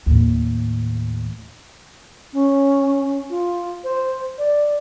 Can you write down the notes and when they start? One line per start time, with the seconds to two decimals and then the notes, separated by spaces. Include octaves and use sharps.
0.06 D#2 A2
2.33 C#4
3.30 F4
3.84 C5
4.38 D5